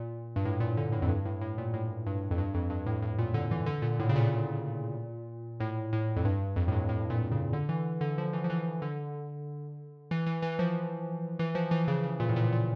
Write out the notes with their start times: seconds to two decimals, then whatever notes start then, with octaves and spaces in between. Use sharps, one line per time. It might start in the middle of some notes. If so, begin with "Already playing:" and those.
Already playing: A#2
0.36 G2
0.45 A2
0.60 A#2
0.77 D3
0.92 A2
1.02 F2
1.08 G2
1.25 A2
1.41 A2
1.58 A#2
1.73 A2
2.06 G2
2.31 F2
2.38 G2
2.54 F2
2.70 G2
2.86 A2
3.02 A2
3.18 A#2
3.34 D3
3.51 E3
3.66 D3
3.82 A#2
3.99 A2
4.09 C#3
4.16 A#2
5.60 A2
5.93 A2
6.16 F2
6.25 G2
6.56 F2
6.68 A2
6.72 G2
6.89 A2
7.10 A#2
7.31 C#3
7.53 D3
7.69 E3
8.01 D3
8.18 F3
8.33 E3
8.44 F3
8.50 E3
8.82 D3
10.11 E3
10.26 E3
10.42 E3
10.59 F3
11.39 E3
11.55 F3
11.71 E3
11.88 C#3
12.03 C#3
12.20 A#2
12.29 A2
12.36 A#2
12.52 A#2